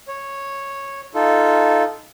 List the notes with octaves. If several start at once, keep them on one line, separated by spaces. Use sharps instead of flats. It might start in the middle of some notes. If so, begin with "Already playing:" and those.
C#5
D#4 F4 A4